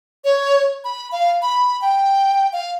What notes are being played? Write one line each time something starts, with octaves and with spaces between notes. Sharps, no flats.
C#5
B5
F5
B5
G5
F5